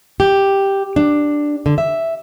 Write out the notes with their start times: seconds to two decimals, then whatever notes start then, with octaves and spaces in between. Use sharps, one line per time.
0.20 G4
0.96 D4
1.66 D3
1.78 E5